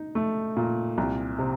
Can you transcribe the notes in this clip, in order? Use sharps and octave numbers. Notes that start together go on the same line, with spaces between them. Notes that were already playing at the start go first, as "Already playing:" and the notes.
Already playing: D#4
A3
A#2
C2
C3